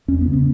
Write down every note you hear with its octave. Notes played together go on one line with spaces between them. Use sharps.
E2 C#4
B3
C#3
B3